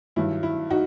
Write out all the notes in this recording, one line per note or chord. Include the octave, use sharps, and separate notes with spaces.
G2 D#3 F#3 E4
E4
D#4 F#4